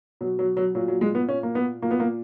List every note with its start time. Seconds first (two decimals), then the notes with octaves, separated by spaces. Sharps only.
0.21 B2 F#3
0.39 F#3
0.57 F#3
0.75 A#2 F#3
0.88 F#3
1.01 G#3
1.15 B3
1.28 A#2 C#4
1.43 A#3
1.55 B3
1.82 A#2 A#3
1.91 B3
2.00 A#3